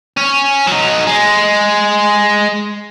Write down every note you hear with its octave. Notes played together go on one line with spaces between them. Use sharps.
C#4
F#3 D#4
G#3